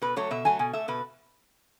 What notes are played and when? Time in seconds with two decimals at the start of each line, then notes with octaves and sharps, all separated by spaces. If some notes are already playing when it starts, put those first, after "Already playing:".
0.02 B2 B4
0.16 F#3 A3 C#5
0.31 B2 E5
0.45 F#3 A3 G#5
0.59 B2 G#5
0.73 A3 E5
0.88 B2 B4